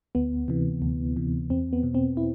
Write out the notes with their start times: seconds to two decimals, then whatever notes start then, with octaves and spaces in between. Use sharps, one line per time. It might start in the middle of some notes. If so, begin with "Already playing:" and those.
0.15 D2 B3
0.48 C3 E3
0.82 D2
1.17 C3 E3
1.50 E2 C4
1.73 B3
1.83 B2
1.95 C4
2.17 E4